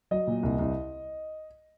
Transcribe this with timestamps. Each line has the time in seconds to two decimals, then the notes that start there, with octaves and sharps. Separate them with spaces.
0.11 F#3 D#5
0.27 A#2
0.43 C2
0.59 C2